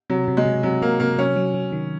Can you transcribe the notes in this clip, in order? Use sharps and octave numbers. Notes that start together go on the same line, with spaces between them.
C3 F#3
C3
G#3
C3
C3 F#3
C3 A#3
C3 A#3
F#3 C#4
F#3
F#3
D#3